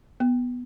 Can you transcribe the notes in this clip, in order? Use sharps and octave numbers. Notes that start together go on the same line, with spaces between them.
B3